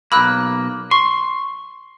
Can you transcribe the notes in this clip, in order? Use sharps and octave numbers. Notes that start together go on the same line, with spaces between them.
B1 A#3 B5 E6 F#6
C6 C#6